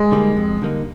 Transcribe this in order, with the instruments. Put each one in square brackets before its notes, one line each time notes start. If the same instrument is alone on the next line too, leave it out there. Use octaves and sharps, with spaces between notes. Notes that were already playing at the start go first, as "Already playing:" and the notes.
Already playing: [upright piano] G#3
[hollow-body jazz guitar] D3 G3 A#3 D#4
F2
D3 G3 A#3 D#4